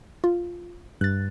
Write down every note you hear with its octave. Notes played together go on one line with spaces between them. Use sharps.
F4
G2 F#6 A6